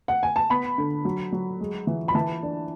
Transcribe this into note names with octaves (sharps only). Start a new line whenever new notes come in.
F#5
G#5
A5
B3 B5
D3
F#3
F#3
G#3
E3
B5
E3 A5
D4